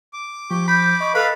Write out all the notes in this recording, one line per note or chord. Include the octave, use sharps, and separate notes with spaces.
D6
F3 G4 C#6
B5 G6
D#5 C#6
A4 B4 F5 B5